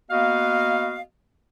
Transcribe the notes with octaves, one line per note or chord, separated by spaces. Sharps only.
A#3 B3 F#4 D#5 F5